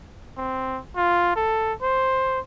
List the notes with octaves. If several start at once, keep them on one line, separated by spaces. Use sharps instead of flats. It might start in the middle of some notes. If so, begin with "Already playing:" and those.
C4
F4
A4
C5